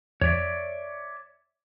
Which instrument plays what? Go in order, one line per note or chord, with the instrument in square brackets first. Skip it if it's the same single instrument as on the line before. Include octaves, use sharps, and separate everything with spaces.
[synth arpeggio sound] F2 [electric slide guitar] C#5 D5 E5